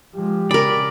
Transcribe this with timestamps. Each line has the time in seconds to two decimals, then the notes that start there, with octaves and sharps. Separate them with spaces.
0.14 F3 G#3 G4
0.51 C#3 A#4 D5 B5